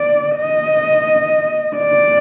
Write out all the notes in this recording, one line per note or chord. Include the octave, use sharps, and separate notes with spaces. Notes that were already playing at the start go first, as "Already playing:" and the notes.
Already playing: D5
D#5
D5